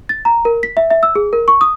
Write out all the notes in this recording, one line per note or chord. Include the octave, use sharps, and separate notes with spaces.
A6
A#5
A#4
B6
E5
E5
E6
G#4
A#4
C#6
D#6